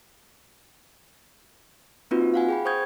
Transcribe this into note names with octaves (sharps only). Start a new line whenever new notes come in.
A#3 C4 D#4 F4 F#4 B4
F5 F#5 G#5
G#4 G5 B5
C5 G5 C#6 D#6 G6 G#6